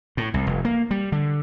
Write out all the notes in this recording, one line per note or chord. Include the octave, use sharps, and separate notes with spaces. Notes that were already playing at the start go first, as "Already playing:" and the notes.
A2
C2
F1
A#3
G3
D3